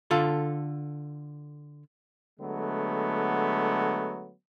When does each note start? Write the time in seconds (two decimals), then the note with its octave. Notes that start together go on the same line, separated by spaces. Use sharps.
0.11 D3 F4 A4
2.40 D3 F#3 G#3 A3 B3